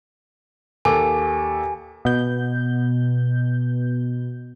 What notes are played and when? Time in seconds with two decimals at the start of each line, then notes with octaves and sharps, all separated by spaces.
0.85 D#2 A4 G#5 D6
2.05 B2 G6